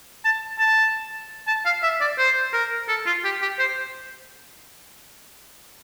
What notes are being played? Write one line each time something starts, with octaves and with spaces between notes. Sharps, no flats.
A5
A5
A5
F5
E5
D5
C5
A#4
A4
F4
G4
G4
C5